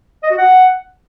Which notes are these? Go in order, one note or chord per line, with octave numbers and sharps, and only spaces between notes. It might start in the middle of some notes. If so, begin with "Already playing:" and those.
D#5
F#4
F#5